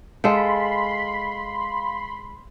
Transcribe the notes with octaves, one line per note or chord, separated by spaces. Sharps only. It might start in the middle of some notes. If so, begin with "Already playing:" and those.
G#3 A4 F5 G5 B5 C6